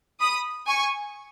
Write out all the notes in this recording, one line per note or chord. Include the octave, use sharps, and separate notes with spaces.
B5 D#6
G#5 C#6